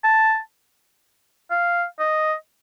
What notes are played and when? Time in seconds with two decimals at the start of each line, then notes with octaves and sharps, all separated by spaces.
0.04 A5
1.50 F5
1.99 D#5